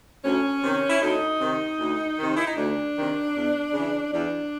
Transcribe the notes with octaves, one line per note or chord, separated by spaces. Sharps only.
D2 C#4
C3 D#3
E4
D2 D#4
C3 D#3
D2
C3 D#3
E4
D#4
D2 D4
C3 D#3
E2
C#3 E3
E2 D4